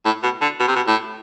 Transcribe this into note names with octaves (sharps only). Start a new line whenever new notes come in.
A2
B2
D3
B2
C3
B2
A2